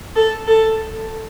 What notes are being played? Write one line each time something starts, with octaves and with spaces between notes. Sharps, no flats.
A4
A4